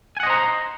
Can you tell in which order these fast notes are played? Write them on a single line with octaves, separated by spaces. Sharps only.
G#5 F#5 D#5 C5 A#5